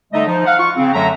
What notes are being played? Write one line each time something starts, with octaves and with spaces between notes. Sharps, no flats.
D3 G3 A3 D#4 D#5
F3 D#4
F5 F#5
F4 C#6
C#3 C4
F#2 D3 F#3 A3 E5 A#5